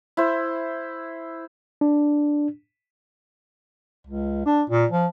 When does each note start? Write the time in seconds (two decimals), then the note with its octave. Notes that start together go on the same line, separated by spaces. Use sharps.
0.17 E4 C5
1.81 D4
4.07 C#2
4.45 D4
4.70 A#2
4.91 F3